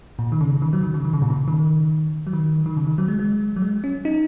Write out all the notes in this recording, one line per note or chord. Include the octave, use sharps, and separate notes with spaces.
A#2
D#3
C#3
D#3
F#3
D#3
C#3
D#3
C#3
A#2
C#3
D#3
F#3
D#3
D#3
C#3
D#3
F#3
G#3
G#3
F#3
G#3
C#4
D#4